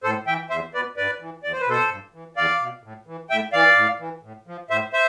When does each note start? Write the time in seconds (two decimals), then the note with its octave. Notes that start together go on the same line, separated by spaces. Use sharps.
0.03 A2 A4 C5
0.27 E3 E5 G5
0.50 E2 C5 E5
0.74 B2 B4 D5
0.97 G2 B4 D5
1.20 E3
1.43 E2 D5
1.53 C5
1.61 B4
1.67 B2 A4 C5
1.90 G2
2.14 E3
2.36 E2 D5 F5
2.60 B2
2.84 A2
3.07 E3
3.30 A2 E5 G5
3.53 E3 D5 F5
3.76 A2
3.99 E3
4.23 A2
4.47 F3
4.70 A2 C5 E5
4.93 C5 E5